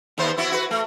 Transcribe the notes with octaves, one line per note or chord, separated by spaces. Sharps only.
D#2 B3 C5
B3 E4 F#4
F#4 B4
A3